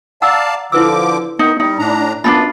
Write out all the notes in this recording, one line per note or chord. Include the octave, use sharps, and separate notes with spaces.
D5 F5 F#5 A5 A#5 E6
D3 F3 E4 B4 D6 E6
D#3 B3 D#4
G3 D#4
A2 D4 A#5
F#2 B3 D4 D#4 F4 A5 B5